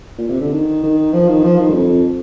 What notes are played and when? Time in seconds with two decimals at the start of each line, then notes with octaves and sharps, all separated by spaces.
0.18 A#2
0.30 C3
0.41 D3
0.52 D#3
0.83 D#3
1.13 F3
1.29 D#3
1.44 F3
1.59 D#3
1.70 G2
1.74 F2